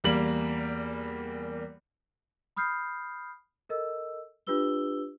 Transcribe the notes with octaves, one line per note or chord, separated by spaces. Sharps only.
E2 G3 A#3 F#7
B5 D#6 F6 G6 C7
A4 A#4 D#5 E6
D4 F4 G4 B4 E6 G7